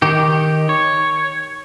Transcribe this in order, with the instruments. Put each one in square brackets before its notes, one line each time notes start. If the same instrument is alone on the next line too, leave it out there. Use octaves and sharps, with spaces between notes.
[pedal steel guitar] D#3 G4
C#5